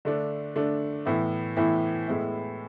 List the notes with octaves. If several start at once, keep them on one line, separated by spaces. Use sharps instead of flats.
D3 A3 D4
D3 A3 D4
A2 E3 B3 E4
A2 E3 B3 E4
A2 G#3 B3 E4